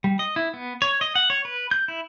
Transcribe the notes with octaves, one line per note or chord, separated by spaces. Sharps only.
G3
D#5
E4
B3
C#5
D#5
F#5
C#5
B4
G6
E4